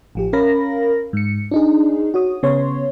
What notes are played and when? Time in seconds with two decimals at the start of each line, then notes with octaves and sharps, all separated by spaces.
0.15 A1 F3 G4
0.33 C#4 A#4 F5 B5 A#6
1.13 G#2 C#7
1.51 D4 D#4 G#4
2.14 F#4 C#5 D#6
2.43 C#3 B3 C#5 C6